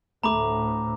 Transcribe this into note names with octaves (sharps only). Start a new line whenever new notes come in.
D2 A2 A3 A#5 B5 D6